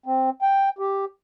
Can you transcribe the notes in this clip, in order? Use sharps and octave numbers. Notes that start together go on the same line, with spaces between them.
C4
G5
G4